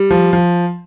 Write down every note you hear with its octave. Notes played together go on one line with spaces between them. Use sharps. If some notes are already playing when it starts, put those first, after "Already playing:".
Already playing: G3
F3
F3